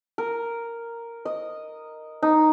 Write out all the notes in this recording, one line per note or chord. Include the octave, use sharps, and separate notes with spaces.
A#4
D#5
D#4